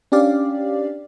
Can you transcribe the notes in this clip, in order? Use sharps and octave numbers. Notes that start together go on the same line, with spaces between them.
C#4 D4 G4 D5 F5